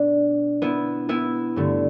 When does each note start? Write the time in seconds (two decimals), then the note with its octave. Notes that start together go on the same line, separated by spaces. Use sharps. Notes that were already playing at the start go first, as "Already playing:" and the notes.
Already playing: B2 B3 D4
0.62 B3 E4
1.09 B3 E4
1.56 G2 D3 A3